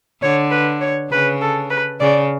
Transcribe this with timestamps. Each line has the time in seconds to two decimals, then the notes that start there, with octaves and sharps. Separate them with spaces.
0.22 D3 C#5
0.51 B4
0.81 C#5
1.11 C#3 B4
1.41 A4
1.70 B4
2.00 C#3 D5